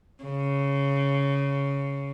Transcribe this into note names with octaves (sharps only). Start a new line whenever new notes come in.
C#3